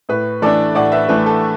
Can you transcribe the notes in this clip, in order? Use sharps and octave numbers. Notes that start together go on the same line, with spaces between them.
A2 B4
E3 A3 D4 A4 D5
A2 D5 F#5
B4 E5
E3 A3 D4 B4
A4